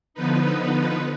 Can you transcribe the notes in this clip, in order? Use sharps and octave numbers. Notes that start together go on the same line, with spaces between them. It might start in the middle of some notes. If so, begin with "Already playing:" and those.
D3 F3 B3 D#4 B4